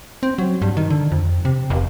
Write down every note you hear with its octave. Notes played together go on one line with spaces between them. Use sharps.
C4
F#3
G2
D#3
D3
F2
C3
F1